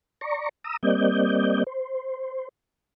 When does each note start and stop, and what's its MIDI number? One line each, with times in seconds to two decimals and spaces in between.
0.21 0.49 74
0.21 0.49 82
0.21 0.49 85
0.64 0.77 82
0.64 0.77 87
0.64 0.77 88
0.83 1.64 55
0.83 1.64 58
0.83 1.64 60
0.83 1.64 74
0.83 1.64 75
0.83 1.64 91
1.67 2.49 72